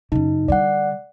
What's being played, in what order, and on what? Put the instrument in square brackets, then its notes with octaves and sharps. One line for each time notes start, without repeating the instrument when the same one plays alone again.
[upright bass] F#2 C#3 [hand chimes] D#4
[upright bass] D3 G3 [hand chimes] D5 F#5